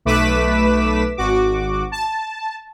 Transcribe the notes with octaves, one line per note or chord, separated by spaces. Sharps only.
B1 A3 B4 D6 B6 E7
G#1 F#4 D6
A5